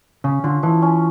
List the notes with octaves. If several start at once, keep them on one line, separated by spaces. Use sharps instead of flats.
C#3 C#4
D3 F4
E3 F3
C#4